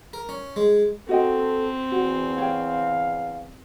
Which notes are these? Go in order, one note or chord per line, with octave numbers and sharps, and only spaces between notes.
A#4
C#4
G#3
C4 F#4 A4 D#5 G5
E2 F#4
C#5 F5 G5